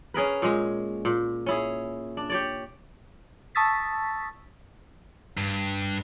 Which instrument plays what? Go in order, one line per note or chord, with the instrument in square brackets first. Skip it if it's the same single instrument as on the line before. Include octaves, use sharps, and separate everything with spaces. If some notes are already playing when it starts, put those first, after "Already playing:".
[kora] C#4 G#4 A#4 B4
A#2 G#3
A#2
C#4 E4 G#4
D4
G4 C#5 D5
[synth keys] A5 C#6 D#6 E6 A6 B6
[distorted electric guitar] G2